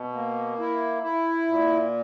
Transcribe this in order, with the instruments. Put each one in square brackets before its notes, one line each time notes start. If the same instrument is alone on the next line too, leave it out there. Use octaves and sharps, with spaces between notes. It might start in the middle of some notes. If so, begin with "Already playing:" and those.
Already playing: [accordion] B2
A#3
E4
E4
A#2